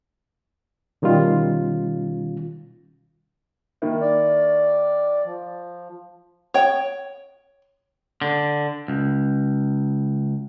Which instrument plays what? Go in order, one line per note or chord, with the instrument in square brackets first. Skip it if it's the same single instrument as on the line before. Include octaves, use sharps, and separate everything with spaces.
[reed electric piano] B2 D#3 G3 C#4 F4
[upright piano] D#3 A#3 E4
[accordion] D5
F3
[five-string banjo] C#5 G5
[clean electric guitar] D3
C#2